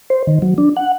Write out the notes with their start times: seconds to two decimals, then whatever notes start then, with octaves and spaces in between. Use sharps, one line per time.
0.10 C5
0.27 D#3
0.42 F#3
0.58 D4
0.77 F#5